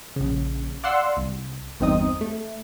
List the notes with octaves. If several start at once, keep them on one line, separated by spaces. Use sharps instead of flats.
A#1 C#3
D5 F5 F#5 C6 E6
C2
G1 E2 G2 C4 D#4 D#6
A3